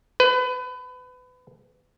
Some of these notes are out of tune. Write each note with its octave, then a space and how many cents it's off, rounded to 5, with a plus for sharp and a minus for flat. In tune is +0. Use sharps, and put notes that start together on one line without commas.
B4 +30